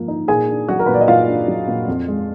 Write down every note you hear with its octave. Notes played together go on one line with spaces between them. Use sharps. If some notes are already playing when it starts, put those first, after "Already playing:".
Already playing: G#2 F3 A#3
D#4
A#2 G#4 G#5
D4
F#3 F#4 F#5
A#4
A#2 B4
D5
D#5
A#2 F4 F5
D4
F#3
A#2
F2
G#3